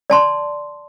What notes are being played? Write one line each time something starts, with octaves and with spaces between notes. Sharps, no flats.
D5 A5 C6